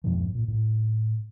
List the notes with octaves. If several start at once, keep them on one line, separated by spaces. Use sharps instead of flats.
F2 G#2 B2 F3
A#2
A2